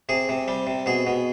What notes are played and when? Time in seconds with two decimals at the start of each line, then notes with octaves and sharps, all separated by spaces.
0.09 C3 G#4
0.29 C3
0.48 G3
0.67 C3
0.86 B2 G#4
1.07 B2